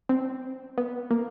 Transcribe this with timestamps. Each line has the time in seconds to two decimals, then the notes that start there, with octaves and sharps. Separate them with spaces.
0.09 C4
0.78 B3
1.11 A#3